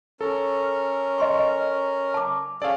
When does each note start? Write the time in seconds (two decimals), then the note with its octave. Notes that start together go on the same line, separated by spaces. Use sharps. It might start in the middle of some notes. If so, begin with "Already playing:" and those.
0.21 C#4 A4 A#4
1.18 D#5 C6 C#6
2.14 A5 D6
2.62 C#4 G#4 A4 D5 F5